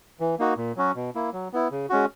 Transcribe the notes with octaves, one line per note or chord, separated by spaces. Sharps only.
E3
A#3 D#4 F#4
A#2
F#3 C#4 F#4
B2
A#3 E4
F#3
B3 E4
C#3
G#3 C#4 F#4